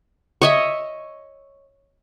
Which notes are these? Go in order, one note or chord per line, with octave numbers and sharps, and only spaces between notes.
C#5 D#5 E5